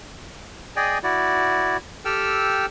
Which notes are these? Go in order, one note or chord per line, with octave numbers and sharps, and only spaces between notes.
G#4 D5 D#5 G5 G#5
E4 F#4 D5
G4 A4 G5 E6 F6